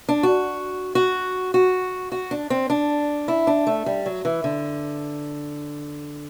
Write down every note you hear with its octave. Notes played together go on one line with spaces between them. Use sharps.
D4
F#4
F#4
F#4
F#4
D4
C4
D4
E4
D4
A3
G3
F#3
E3
D3